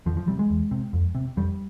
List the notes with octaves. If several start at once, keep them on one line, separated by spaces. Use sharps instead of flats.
E2 F3
F3
C3 G3
G#3
E2
C3
F2
C3
F2 G3